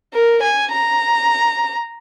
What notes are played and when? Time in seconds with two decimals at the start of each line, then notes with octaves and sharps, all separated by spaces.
0.14 A#4
0.42 G#5
0.72 A#5